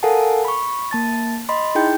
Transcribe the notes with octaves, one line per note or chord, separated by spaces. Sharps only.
A4 A#4 F5 F#5 G#5 A5
B5 C#6
A#3 A5 A6
D#5 B5 C6
D#4 E4 G#4 G5 G6